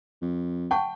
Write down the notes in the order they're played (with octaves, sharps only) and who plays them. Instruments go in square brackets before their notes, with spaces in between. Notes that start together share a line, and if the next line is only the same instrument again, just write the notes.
[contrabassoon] F2
[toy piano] F#5 A5 C#6 [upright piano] G5